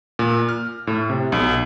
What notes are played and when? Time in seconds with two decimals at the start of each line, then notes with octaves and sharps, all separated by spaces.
0.19 A#2
0.49 F6
0.87 A2
1.10 C3
1.32 B1